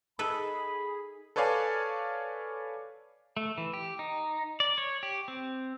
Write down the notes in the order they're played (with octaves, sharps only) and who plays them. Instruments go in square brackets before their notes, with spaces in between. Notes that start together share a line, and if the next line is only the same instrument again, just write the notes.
[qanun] D#4 [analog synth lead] G#4 [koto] A4 B4 E5 [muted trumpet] B5
[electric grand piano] A4 B4 C#5 D5 F5 G#5
[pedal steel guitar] A3
E3
G4
D#4
D5
C#5
G4
C4